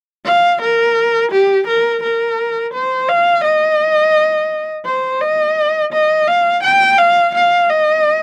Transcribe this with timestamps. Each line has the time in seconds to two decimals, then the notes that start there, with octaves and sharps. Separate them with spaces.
0.25 F5
0.61 A#4
1.31 G4
1.67 A#4
2.03 A#4
2.73 C5
3.09 F5
3.44 D#5
4.85 C5
5.21 D#5
5.92 D#5
6.28 F5
6.63 G5
6.98 F5
7.34 F5
7.69 D#5